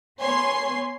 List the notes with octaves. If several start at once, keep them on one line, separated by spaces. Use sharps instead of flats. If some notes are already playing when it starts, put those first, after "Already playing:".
B3 C#5 G#5 C6 C7